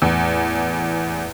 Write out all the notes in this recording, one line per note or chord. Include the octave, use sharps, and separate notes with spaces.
E2 A2